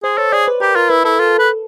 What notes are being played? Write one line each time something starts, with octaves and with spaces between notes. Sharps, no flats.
G#4 C5
A4 C#5
G#4 D5
B4
G4 A#4
F4 A#4
E4 B4
E4 A4
F4 A4
B4